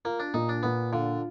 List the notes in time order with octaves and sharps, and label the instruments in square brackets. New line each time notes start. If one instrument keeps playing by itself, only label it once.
[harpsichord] A#3 [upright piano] F4
[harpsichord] D4
[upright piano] A#2 [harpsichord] D#4
[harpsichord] D4
[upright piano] A#2 [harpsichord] B3
[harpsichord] D3 [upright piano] F4